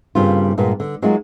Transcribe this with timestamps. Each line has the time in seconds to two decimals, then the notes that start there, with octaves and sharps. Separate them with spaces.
0.15 G2 C#3 G3 A#3 C4 F4
0.58 G2 A#2 G#3 B3
0.80 D3
1.02 F#3 G#3 A#3 D#4 F4 F#4